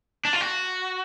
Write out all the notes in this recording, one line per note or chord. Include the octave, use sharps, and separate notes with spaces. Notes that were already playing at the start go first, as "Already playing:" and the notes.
D4
F4
F#4